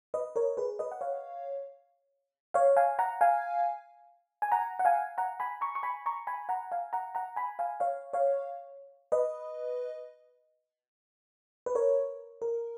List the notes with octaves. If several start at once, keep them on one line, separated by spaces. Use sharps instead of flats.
B4 D#5
A#4 C#5
G#4 B4
B4 D#5
F#5
C#5 F5
C#5 F5
F5 G#5
F#5 A#5
F5 G#5
G#5
F#5 A#5
F#5
F5 G#5
F#5 A#5
G#5 B5
A#5 C#6
C#6
G#5 B5
A#5 C#6
G#5 B5
F#5 A#5
F5 G#5
F#5 A#5
F#5 A#5
G#5 B5
F5 G#5
C#5 F5
C#5 F5
B4 D#5
B4
A#4 C#5
A#4